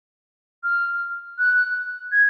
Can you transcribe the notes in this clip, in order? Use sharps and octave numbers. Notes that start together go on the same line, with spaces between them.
F6
F#6
G#6